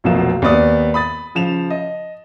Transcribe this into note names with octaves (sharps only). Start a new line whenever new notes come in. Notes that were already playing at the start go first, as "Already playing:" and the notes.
F1 B1 B2 F3 A#3 E7
D#2 B3 D5 D#6
B5 D#6 A6
C#3 F3 E7 F7
D#5